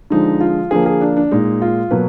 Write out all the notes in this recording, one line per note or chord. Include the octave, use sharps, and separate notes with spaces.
D3 F3 G#3 D#4
F4
D3 F3 A#3 G#4
G#4
D4
D4
A#2 G#3 D#4
F4
B2 F#3 A#3 B4